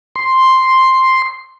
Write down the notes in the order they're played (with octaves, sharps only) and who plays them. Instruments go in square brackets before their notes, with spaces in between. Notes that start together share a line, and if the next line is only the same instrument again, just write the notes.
[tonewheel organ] C6